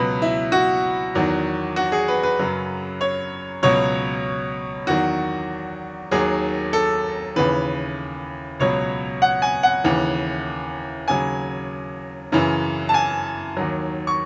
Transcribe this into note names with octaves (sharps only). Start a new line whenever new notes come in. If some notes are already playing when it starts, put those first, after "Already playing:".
Already playing: C#2 B2 F#3 B4
E4
F#4
E2 D#3 F#3
F#4
G#4
B4
B4
F#2 C#3 F#3
C#5
C#2 B2 F#3 C#5
E2 D#3 F#3 F#4
D#2 D#3 F#3 G#4
A4
D#2 C#3 E3 B4
C#2 B2 F#3 C#5
F#5
G#5
F#5
D#2 C#3 E3
D#2 C#3 F#3 G#5
F#2 C#3 E3
A5
G#5
D#2 D#3 F#3
C#6